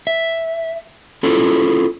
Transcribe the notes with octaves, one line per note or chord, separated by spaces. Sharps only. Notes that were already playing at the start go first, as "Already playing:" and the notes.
E5
C#4 E4 F4 G#4 A4